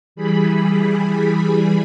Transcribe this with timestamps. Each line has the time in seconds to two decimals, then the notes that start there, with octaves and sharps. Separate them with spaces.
0.15 E3 G3 G#4 B5